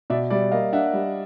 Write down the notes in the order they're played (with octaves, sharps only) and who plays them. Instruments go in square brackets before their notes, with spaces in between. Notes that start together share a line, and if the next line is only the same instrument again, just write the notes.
[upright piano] B2 [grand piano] D5 E5
[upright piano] G3 [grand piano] D5 E5
[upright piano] A#3 [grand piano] D#5 F5
[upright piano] D4 [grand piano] E5 F#5
[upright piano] G3